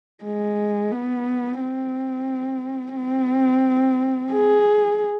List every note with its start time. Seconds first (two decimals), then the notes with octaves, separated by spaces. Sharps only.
0.24 G#3
0.92 B3
1.60 C4
2.96 C4
4.32 G#4